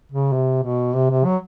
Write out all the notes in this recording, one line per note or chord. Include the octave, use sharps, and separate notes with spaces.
C#3
C3
B2
C3
C3
F#3